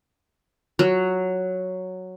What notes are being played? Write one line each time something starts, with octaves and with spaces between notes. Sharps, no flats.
F#3